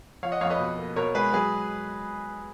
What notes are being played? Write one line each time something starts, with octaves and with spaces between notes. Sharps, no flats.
F3 C#5 F5
D#5 F#5
F2 C#5 F5
B4 D#5
B2
A#3
B2 A#4 C#5
G#3 G#4 B4
F#3 G#4 B4